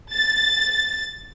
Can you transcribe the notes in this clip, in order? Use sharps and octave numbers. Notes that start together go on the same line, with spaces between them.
A6